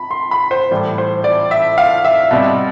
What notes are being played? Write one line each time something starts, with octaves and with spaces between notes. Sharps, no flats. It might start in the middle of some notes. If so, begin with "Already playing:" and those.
Already playing: B5
C6
B5
C5
A2 E3 G3
C5
D5
E5
F5
E5
B2 G3 C4